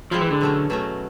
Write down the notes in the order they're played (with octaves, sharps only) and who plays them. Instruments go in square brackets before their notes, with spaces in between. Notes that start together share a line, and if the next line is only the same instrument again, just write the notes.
[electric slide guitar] F3 [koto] G#3 C4 E4
[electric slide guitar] E3
D3
[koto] B2 F#3 A3 C#4
B2 F#3 A3 C#4